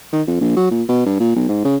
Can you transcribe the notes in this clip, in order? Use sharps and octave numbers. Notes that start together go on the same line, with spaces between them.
D#3
F2
A#1
F#3
A#2
B2
G2
A#2
B1
G#2
C#3